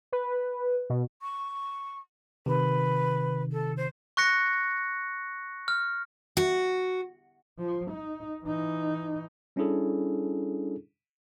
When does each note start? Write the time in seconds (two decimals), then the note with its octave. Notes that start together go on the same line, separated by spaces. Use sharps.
0.12 B4
0.90 B2
1.22 C#6
2.46 C3 D#3 B4
3.51 A4
3.76 C5
4.17 C#6 F#6 A#6 C#7
5.68 F6
6.37 F#4
7.59 F3
7.91 D#4
8.44 E3 D#4
9.56 G3 C#4 D4 E4 G#4 A4